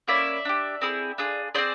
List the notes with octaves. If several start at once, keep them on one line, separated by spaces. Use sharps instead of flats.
A#3 C#4 E4 D5 E5
D4 G4
C4 E4 G#4
D4 F4 G#4
C4 D#4 G#4 C5 D5